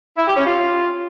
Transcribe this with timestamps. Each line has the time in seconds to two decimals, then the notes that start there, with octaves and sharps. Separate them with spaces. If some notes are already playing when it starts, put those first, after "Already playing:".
0.17 E4
0.27 G4
0.37 C#4
0.47 F4